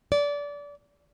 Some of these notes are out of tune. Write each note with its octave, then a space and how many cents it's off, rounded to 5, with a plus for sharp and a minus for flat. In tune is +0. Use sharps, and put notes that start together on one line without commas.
D5 -25